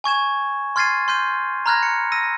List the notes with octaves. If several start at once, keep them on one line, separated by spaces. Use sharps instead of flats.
G#5 C#6 G#6 E7
C6 F6 G#6 A6 C7 D#7
C6 F6 G6 B6 D#7
A#5 B5 F6 F#6 G#6 A#6
C#7
E6 A#6 D#7